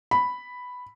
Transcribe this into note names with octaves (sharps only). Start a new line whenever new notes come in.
B5